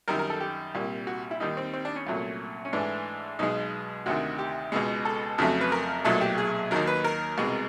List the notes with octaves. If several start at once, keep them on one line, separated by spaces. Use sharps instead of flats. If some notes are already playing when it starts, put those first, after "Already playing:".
F#2 D#3 G3 A#4
A#4
A4
G4
C2 A#2 G3
F#4
E4
D#2 D#3 G3 D#4
C4
C4
D4
C#4
C2 A#2 F#3 A3
C#4
G#2 E3 A3 D4
B1 B2 G#3 D#4
D2 C3 D#3 F#4
G4
C#2 B2 G#3
A4
F2 C#3 F#3 A3
B4
A#4
B1 A#2 F#3 A3 A4
G4
G#4
D#2 D#3 F#3 A#4
B4
A#4
C2 B2 G#3